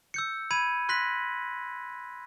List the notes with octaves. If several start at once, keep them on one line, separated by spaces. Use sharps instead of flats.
E6 G6 C#7
B5 G#6 D#7
C6 F#6 A#6 B6 F#7